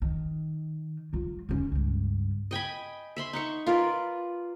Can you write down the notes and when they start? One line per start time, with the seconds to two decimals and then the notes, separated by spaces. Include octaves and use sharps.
0.02 D#3
1.13 F#3 F4
1.49 D3 C#4
1.72 C#2 G2
2.51 D#5 G5 G#5 B5
3.16 E5 B5 C6
3.33 D#4 F#5 C#6
3.66 F4 A#4 B4 D5